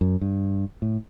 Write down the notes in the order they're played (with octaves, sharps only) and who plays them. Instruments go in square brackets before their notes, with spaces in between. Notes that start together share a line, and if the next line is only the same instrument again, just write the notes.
[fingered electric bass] F#2
G2
A2